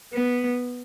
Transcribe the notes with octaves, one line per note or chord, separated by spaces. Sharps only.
B3